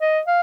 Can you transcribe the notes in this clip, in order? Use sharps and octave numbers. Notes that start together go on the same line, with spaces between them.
D#5
F5